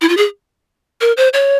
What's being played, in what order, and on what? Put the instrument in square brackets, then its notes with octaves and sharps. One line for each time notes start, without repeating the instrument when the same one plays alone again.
[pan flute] E4
F4
G#4
A#4
C5
C#5